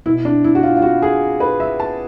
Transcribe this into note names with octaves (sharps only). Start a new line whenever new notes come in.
B2 E4
D4
E4
F#4
F4
F4
F#4
G#4
B4
E5
A5